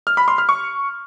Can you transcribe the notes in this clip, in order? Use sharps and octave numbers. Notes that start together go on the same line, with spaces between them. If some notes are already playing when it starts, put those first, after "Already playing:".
F6
B5
C6
F6
C#6